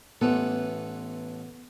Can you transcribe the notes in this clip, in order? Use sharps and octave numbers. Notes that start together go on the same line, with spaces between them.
A1 E3 B3 A4